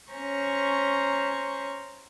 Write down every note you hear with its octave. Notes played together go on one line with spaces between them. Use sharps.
C#4 C5 A#5 C#6